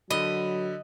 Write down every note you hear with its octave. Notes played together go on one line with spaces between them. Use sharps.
D3 F#3 D#5 B5